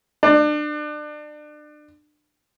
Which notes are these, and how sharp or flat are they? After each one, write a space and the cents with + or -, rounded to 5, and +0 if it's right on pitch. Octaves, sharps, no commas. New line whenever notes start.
D4 +30